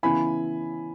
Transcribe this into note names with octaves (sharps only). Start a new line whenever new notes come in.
C#3 E3 B3 E4 G#5 B5